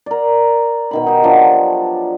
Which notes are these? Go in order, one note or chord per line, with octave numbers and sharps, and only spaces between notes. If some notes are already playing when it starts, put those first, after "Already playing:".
A#4 D5
B2 D#3 B5
D#4 G4
F3 F#3 D4